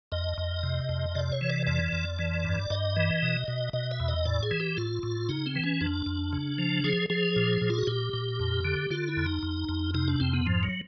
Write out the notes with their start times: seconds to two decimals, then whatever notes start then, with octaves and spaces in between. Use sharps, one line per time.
0.12 F2 D#5
0.38 F2
0.63 C3
0.89 F2
1.15 C3 D5
1.32 C#5
1.41 E3
1.50 D5
1.67 F2 D5
1.93 F2
2.19 E3
2.44 G2
2.70 G2 D#5
2.96 E3
3.22 B2
3.48 B2
3.73 B2 D#5
3.91 E5
4.00 E2
4.08 D#5
4.25 A2 D5
4.43 G#4
4.51 E3
4.60 G4
4.77 A2 F4
5.03 A2
5.29 C#3 D#4
5.46 C4
5.55 E3
5.64 C#4
5.81 F2 D4
6.06 F2
6.33 C#3
6.58 F3
6.84 F3 G#4
7.10 F3 G#4
7.36 A#2
7.61 A#2
7.70 F4
7.79 F#4
7.87 A#2 G4
8.13 A#2
8.40 F2
8.65 D3
8.91 D3 F4
9.08 E4
9.17 F2
9.26 D#4
9.43 F2
9.69 F2
9.94 C3 D#4
10.08 D4
10.20 F2 C4
10.33 B3
10.46 G#2 F3
10.63 F#3